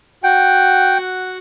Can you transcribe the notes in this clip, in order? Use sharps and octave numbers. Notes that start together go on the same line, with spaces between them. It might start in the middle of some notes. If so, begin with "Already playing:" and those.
F#4 F#5 G5